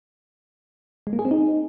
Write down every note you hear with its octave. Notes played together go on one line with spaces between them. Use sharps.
G#3
A#3
G#4
C4
D#4